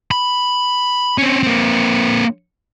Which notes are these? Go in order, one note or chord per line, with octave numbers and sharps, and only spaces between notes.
B5
C4 C#4
A#3 C4